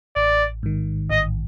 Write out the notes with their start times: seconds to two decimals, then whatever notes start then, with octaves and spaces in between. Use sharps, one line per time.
0.16 A1 D5
0.63 G#2 D#3
1.11 A1 D#5